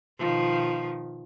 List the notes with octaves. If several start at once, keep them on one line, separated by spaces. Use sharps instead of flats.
B2 D#3 F3